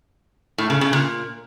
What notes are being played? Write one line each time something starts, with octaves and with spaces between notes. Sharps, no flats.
A2
C#3
C#3
A#2